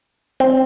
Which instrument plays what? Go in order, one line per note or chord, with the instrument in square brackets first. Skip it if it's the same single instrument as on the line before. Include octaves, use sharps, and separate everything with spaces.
[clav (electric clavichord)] C4